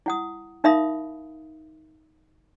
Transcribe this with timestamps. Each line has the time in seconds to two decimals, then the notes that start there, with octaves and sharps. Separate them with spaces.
0.06 E4 F#5 D#6
0.64 D#4 A#4 E5 F5 B5 D#6